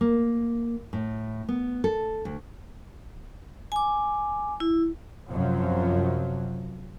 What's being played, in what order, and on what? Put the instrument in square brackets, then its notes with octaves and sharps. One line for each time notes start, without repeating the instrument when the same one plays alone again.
[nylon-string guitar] A#3
A2
B3
A4
D2
[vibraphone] G#5 D6
E4
[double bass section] F#2 C3 F3 F#3